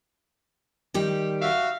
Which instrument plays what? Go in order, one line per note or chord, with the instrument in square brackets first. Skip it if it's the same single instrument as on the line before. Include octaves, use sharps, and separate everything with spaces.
[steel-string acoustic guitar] D#3 G3 G4
[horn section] F#4 E5 F5